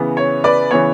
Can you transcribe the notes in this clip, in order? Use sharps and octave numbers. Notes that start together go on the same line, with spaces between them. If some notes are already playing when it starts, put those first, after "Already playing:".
Already playing: C#3 E3 B3
C#5
B4 D5
C#3 E3 B3 C#5